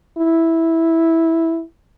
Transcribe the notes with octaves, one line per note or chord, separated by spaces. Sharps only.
E4